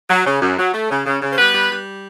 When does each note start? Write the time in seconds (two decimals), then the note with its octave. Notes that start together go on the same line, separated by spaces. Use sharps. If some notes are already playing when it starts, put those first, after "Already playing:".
0.09 F#3
0.26 C#3
0.41 F#2
0.58 F#3
0.73 A3
0.90 C#3
1.06 C#3
1.22 C#3
1.33 C5
1.38 G3 B3 B4
1.54 G3
1.70 G3